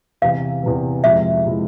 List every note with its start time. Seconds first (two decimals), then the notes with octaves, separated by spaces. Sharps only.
0.22 E2 C3 E3 F5
0.63 E2 C3 E3
1.04 F2 C3 F3 G#3 E4 E5
1.45 C3 F3 G#3 E4